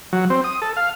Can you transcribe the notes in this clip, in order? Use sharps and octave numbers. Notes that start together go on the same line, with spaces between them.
F#3
C4
D#6
A4
F5